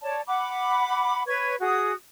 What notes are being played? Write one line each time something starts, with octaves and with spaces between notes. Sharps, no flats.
C#5 D5 A5
F#5 B5 D6
B4 C#5 C#6 G#6
F#4 G#4 D#6